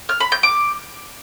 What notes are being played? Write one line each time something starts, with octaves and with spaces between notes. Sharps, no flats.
F6
B5
G6
D6